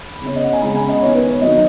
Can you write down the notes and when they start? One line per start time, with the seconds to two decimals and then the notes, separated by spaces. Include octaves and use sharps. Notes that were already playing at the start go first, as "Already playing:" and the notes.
Already playing: B5
0.22 C#3 B3 C#5
0.36 D#5
0.44 F#5
0.53 G#5
0.61 C#3 G#3 B3 B5
0.75 G#5
0.88 D#5
1.01 D#3 B3 C#5
1.14 B4
1.28 C#5
1.41 D#3 F#3 B3 D#5